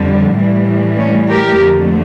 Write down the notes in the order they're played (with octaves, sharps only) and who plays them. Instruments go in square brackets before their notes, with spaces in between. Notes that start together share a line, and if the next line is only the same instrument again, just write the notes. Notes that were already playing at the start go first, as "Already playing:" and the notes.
Already playing: [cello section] F2 D3 G3
A2 E3 G3
A3 C#4
G4 A#4
F2 D3 A3